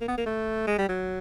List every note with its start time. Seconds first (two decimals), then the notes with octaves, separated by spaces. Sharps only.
0.01 A#3
0.08 B3
0.18 A#3
0.26 A3
0.67 G#3
0.78 G3
0.89 F#3